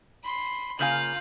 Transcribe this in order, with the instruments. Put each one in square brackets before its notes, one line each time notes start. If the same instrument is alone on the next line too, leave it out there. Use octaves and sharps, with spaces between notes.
[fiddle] B5 C6
[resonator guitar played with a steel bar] C#3 A#3 G#5 [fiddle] F4 F5 [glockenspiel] G6 F#7